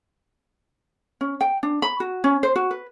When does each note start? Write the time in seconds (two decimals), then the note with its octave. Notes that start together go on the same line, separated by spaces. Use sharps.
1.21 C#4
1.41 G5
1.63 D4
1.82 B5
2.00 F#4
2.24 C#4
2.43 C5
2.56 F#4
2.71 B4